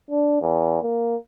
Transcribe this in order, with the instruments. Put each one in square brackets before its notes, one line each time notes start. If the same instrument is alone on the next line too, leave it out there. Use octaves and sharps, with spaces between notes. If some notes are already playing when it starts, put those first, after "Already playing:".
[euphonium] D4
E2
A#3